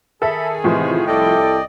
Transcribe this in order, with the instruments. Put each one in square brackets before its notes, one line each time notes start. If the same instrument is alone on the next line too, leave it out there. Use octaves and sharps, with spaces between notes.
[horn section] D#3 G#4 [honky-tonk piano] A4 E5 [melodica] B5
[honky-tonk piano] A2 F3 [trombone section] C3 E3 [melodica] G#3
[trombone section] C2 E4 A4 [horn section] D5 G5 [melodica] D#5